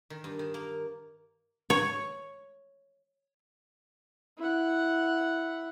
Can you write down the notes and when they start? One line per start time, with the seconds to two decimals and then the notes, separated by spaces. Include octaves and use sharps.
0.10 D#3
0.24 G2
0.39 D#3
0.54 A#3
1.70 C#5
4.38 E4 F#5